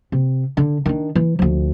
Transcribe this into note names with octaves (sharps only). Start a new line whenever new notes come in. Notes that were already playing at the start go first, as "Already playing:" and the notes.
C3
D3
D#3 D4
E3
D2 F3